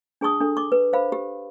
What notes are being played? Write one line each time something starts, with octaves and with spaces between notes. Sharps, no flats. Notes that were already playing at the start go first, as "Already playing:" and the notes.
D4 G#4 A5 C#6 D#6
D4 A4
C#6 D6
B4
C5 F5 B5
G4